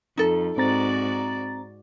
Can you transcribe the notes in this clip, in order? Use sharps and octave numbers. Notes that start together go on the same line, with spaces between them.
F2 D#4 A4
G#2 C4 F#4 D5 A#5 A6